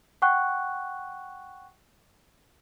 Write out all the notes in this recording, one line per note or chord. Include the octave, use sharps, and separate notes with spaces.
F#5 G5 C#6 F#6